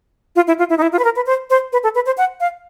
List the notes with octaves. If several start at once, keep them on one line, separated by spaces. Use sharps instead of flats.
F4
E4
F4
E4
D#4
E4
F4
B4
A#4
B4
C5
C5
B4
A4
B4
C5
F#5
F5